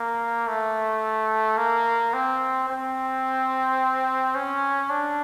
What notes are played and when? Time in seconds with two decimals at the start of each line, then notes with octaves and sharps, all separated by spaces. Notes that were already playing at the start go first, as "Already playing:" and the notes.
Already playing: A#3
0.48 A3
1.58 A#3
2.13 C4
2.69 C4
4.35 C#4
4.90 D4